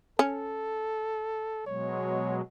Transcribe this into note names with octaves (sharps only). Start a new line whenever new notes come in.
C#4 A4
B2 F#3 G#3 C#5